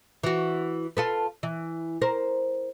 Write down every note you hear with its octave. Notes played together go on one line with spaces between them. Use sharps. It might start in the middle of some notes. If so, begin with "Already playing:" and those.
E3 F#4
F4 A4 B4
E3
A#4 C5